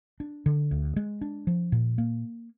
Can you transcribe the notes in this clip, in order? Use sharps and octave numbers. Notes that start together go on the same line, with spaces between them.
D4
D3
D2
G#3
D4
F3
A#2
A#3